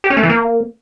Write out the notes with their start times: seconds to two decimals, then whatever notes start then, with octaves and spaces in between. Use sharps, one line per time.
0.04 G4
0.10 C#4
0.17 A3
0.23 E3
0.30 A#3